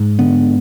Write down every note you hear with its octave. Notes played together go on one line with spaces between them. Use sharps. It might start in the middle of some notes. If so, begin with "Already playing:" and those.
Already playing: G#2
D3 B3